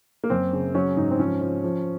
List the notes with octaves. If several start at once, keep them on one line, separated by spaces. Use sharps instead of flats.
A#3
F#2 C4
C#3
F#3 C#4
G#2 D#4
C4
F3 C#4
F3
F3